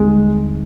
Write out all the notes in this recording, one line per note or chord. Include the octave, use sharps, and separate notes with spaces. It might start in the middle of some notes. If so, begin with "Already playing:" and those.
Already playing: D#2 D3 G3 G#3 C4 D#4